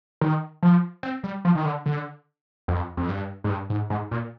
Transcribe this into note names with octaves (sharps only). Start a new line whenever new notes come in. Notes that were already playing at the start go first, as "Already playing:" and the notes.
D#3
F3
C4
G3
F3
D#3
D3
D3
F2
F2
G2
G#2
G2
G#2
G#2
A#2